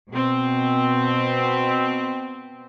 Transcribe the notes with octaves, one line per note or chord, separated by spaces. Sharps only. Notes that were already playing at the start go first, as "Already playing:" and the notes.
B2 C4